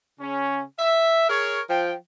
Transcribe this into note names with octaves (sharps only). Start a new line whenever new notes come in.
C#3 C#4
E5
G#4 A#4 C#5
F3 G5